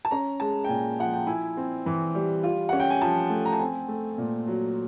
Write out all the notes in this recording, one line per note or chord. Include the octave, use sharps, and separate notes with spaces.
A5
C#4 A#5
G#3 A5
G5
A#2 G#5
F3 F#5
G5
E4 G#5
C4
E3
G3
F4
C#4 F#5
G5
G#5
F3 A5
A3
A#5
A5
C4 G#5
A3
A#2
F#3